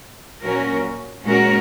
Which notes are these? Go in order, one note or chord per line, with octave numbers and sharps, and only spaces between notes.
A#2 F#3 C#4 F#4 A#4
A#2 G#3 C#4 F#4 A#4